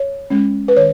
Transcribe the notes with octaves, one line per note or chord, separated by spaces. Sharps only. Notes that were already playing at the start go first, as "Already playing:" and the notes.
Already playing: C#5
G#3 C#4
B4
D#3 C#5